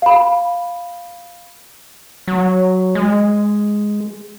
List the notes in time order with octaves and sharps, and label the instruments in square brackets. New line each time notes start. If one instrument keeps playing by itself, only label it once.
[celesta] F5 B5
[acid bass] F#3
G#3